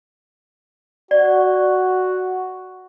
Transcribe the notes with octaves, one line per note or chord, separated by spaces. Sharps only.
F#4 D5